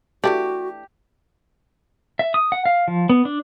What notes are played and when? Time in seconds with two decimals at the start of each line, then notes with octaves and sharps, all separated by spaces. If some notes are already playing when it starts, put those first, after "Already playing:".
0.24 E3 A3 D4 F#4 G4
2.19 E5
2.34 D#6
2.52 F#5
2.66 F5
2.88 F3
3.10 B3
3.25 D4